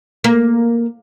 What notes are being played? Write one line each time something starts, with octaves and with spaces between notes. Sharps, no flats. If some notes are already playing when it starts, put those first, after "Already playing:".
A#3